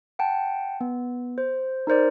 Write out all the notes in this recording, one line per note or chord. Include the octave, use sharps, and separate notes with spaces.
F#5 G5 A5
B3
C5
D#4 A#4 C5 D5